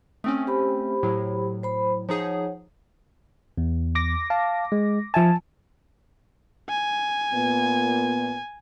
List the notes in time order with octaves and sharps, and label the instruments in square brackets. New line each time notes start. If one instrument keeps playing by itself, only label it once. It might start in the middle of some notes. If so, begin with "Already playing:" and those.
[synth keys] A3 C4 C#4 [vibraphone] D#6
[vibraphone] G4 C5 B5
[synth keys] A2 F#3
[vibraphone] C5 B5
[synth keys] F3 D#4 G#4 [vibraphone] C#5 F#5
[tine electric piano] E2
[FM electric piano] D6 A#6
[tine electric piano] F5 A5
G#3
[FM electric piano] F3 E5 G#5 [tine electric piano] A5
[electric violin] G#5
[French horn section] A#2 B3